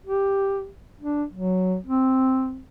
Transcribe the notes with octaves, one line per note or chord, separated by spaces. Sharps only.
G4
D4
F#3
C4